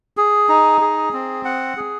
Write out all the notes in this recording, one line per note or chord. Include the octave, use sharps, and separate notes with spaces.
G#4
D#4
G#4
C4
F#5
G#4